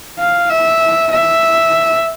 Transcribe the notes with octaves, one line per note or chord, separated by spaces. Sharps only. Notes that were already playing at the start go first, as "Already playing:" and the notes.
F5
E5
E5